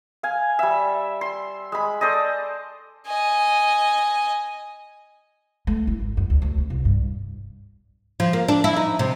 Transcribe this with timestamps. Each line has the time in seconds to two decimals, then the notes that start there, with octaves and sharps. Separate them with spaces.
0.23 F5 G#5
0.59 G3 E5
1.21 C6
1.72 G#3 B5
2.01 A4 C5 D5 D#5
3.07 D#5 G#5
5.67 A3
5.87 E4
6.00 G#1
6.17 F#2
6.30 D2
6.42 D2
6.58 C#3
6.70 C2
6.85 G2
8.20 F3
8.33 A#3
8.48 D4
8.64 E4
8.76 D#4
8.99 C3